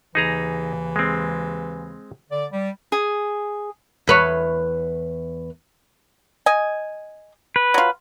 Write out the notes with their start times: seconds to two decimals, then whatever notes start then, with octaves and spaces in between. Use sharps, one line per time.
0.15 D#2 C#3 E3 D#4 G#4 A#5
0.96 G#3 C4
2.31 D3 D5
2.52 G3
2.92 G#4
4.07 E2 B4 C#5
6.46 D#5 G#5
7.56 B4
7.74 F#3 F4